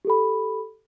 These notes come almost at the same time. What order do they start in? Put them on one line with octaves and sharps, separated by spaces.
G4 A4 B5